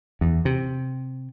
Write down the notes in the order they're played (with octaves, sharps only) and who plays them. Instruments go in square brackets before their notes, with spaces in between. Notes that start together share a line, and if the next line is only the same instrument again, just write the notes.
[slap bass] E2
C3